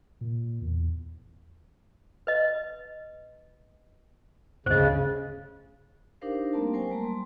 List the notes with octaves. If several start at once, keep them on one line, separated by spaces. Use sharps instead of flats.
A#2
E2
B4 D#5
G1 D2 C#3 C5 D#5
D4 D#4 G4 A#4 C5 F5
G3 A3 A#3 C4 A#4 A5
F#3 C#4 A#4 C5 G5 G#5
G3 A3 A#3 A5 A#5
G3 C6